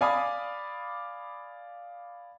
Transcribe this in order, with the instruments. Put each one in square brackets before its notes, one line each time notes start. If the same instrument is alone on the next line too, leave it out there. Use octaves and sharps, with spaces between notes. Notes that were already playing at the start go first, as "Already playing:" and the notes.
[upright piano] D5 F5 G#5 B5 D6 D#6